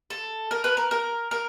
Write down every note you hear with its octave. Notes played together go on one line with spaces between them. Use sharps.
A4
A#4
B4
A#4
A#4
A#4